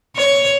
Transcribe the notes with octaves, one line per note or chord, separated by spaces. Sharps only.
C#5